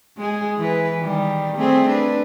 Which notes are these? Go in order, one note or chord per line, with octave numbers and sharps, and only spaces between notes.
G#3 G#4
E3 B4
D#3 G3
A3 C4 G#4
D4 B4